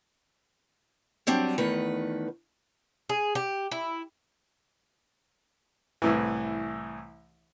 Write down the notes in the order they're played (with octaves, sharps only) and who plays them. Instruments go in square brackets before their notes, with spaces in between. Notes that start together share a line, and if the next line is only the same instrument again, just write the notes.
[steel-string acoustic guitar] F#3 G3 C4 D4
E2 D#3 A3 B4
[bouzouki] G#4
G4
E4
[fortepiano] C2 A2 E3